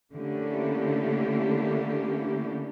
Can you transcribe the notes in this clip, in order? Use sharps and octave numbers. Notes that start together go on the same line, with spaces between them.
D3 A3 A#3 C#4 E4 G4